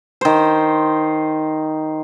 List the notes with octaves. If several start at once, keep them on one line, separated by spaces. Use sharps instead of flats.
D#3 C5